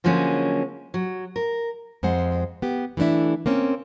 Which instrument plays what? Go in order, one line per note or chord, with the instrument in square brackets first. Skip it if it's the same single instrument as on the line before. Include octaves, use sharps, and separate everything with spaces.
[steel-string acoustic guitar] D3 F3 F#3 G#3 A#3 C#4
F#3
A#4
[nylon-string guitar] F2 G#3 C5 F#5
B3 G4
E3 A3 B3 D4 E4
A#3 C4 C#4